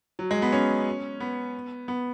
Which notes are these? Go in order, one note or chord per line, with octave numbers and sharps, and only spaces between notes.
F#3
G#3
B3
C#4
B3
B3